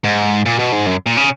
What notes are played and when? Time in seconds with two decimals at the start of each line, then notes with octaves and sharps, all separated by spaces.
0.04 G#2
0.46 A#2
0.59 B2
0.72 G#2
0.86 F#2
1.06 A#2
1.17 C#3